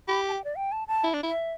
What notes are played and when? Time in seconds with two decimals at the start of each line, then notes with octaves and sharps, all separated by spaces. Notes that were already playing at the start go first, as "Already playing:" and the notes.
0.08 G4 B5
0.29 A5
0.32 G5
0.44 D5
0.56 G5
0.72 A5
0.88 A5
1.04 E4
1.14 D4
1.23 E4
1.27 E5